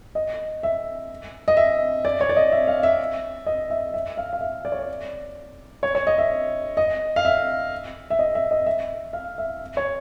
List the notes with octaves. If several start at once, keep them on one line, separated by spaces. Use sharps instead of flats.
D#5
E5
D#5
E5
D5
C#5
D5
D#5
E5
F5
E5
D#5
E5
E5
F5
F5
E5
D5
C#5
D5
C#5
C#5
D#5
E5
D#5
F5
E5
E5
D#5
E5
D#5
E5
F5
E5
C#5